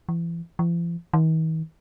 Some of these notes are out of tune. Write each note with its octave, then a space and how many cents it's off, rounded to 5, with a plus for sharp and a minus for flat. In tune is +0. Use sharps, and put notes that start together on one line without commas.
E3 +35
F3 -45
D#3 +45